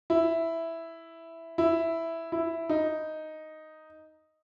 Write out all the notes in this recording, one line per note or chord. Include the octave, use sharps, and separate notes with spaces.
E4
E4
E4
D#4